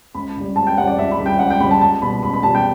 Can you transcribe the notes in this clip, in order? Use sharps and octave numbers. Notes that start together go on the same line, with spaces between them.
C#2 B5
C#3 G3
C#2 A5
G5
C#3 G3 F#5
D5
C#2 E5
B5
C#3 G3
G5
C#2 F#5
G5
C#3 G3 B5
A5
C#2 A5
B2 G3 B5
C#2 B5
B5
B2 G3 A5
G5